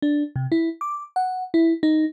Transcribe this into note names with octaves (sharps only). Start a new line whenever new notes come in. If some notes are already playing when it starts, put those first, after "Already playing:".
D4
C3
E4
D6
F#5
E4
D#4